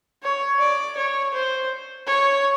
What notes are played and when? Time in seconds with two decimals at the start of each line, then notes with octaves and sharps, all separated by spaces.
0.23 C#5
0.60 D5
0.97 C#5
1.34 C5
2.07 C#5